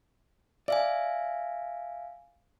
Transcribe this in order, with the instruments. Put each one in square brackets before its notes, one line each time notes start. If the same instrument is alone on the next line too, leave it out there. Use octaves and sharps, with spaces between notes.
[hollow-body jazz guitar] D5 [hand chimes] E5 F5 G#5